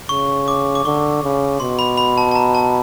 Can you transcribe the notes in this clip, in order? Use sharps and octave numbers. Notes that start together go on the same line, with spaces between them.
C#3 C#6
D6
D6
D3 C#6
C#3
B2 C6
B5
B5
A5
A5
A#5
A5